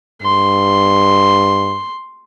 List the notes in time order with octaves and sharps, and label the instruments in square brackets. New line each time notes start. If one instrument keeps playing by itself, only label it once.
[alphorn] G2 [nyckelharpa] C6